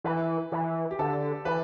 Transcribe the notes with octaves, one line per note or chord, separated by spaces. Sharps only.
E3 B4
E3
G4
D3 A4
E3 B4